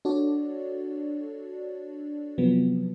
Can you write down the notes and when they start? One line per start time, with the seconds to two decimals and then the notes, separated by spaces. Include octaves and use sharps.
0.05 D4 F#4 A4 C#5 D5
2.38 C3 F3 F#3 B3